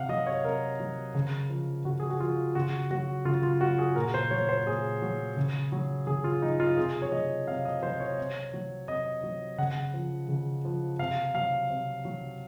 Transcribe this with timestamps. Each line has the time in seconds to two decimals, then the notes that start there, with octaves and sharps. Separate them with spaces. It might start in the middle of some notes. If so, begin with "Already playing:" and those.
Already playing: C3 F5 F#5
0.09 F#3 D#5
0.27 C#5
0.44 C3 A#4
0.80 F#3
1.14 C#3
1.49 F3
1.85 C#3 F#4
2.00 G#4
2.10 F#4
2.20 F3 F4
2.55 C#3 F#4
2.90 F#3 F#4
3.25 C#3 F4
3.43 F4
3.61 F#3 F#4
3.78 G#4
3.96 A#2 A#4
4.14 C5
4.31 F#3 C#5
4.49 C5
4.66 A#2 G#4
5.02 F#3
5.37 C#3
5.72 F#3
6.07 C#3 G#4
6.24 F4
6.42 F#3 D#4
6.60 F4
6.77 C3 G#4
7.02 C#5
7.12 F#3 D#5
7.47 C3 F5
7.65 D#5
7.83 F#3 C5
8.00 C#5
8.18 C3
8.53 F#3
8.88 C3 D#5
9.23 F#3
9.58 C#3 F#5
9.94 F3
10.28 C#3
10.65 F3
10.99 C3 F5
11.34 F#3 F5
11.70 C3
12.05 F#3